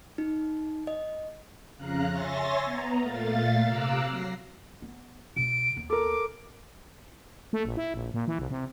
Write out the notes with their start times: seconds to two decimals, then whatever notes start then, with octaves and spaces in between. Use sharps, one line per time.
0.18 D#4
0.87 D#5
1.77 F2 C#3 F5 A#5 F#6
2.09 C#5 E5 G#5 C6 A6 A#6
2.65 B3 A#5
3.00 A#2 A3 F5 A6
3.64 C3 F5 A#5 D6 E6 F#6
4.03 F#3 A#6 C7
4.82 B3
5.36 B2 E4 D7
5.77 D#2 B3
5.90 A4 A#4 D6
7.53 A3
7.65 A#1
7.77 E4
7.94 A#1
8.14 A#2
8.27 E3
8.39 C2
8.51 C3